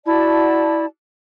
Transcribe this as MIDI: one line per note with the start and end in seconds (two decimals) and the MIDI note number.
0.06 0.85 64
0.06 0.85 66
0.06 0.85 74
0.06 0.85 81